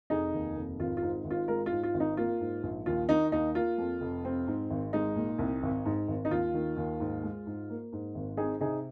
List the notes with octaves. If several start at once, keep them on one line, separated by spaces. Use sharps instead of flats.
F1 D#4 G#4
D#2
F1
G#1 F4
F4
G#2
G#1
F4
G#3 F4 A#4
F4
G#2
F4
G#1
D#4
A#3 F4
G#2
A#1
D#2 F4
D#3 D#4
D#2 D#4
A#3 F4
F2
F1
C4
G#2
G#1
G#3 D#4
A#2
C2
G#1
G#2
G#1
D#4
D#2 F4
D#3
D#2
G#2
G#3
G#2
A#3
G#2
G#1
C4 D#4 G#4
C3 D#4 G#4